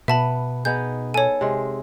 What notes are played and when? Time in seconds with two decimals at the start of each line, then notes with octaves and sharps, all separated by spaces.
0.08 B2 B3 E5 A5 B5
0.65 B3 D#4 G#4 G6
1.14 A4 C#5 G#5
1.41 C3 G#3